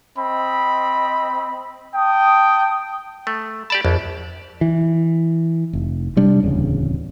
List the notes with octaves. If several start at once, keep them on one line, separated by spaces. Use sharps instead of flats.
C4 D#5 B5
G5 A5 D#6
A3
G4 D5 A5 B5
A#1 F2
E3
F1
C3 G3 D4
D1 E2 C#3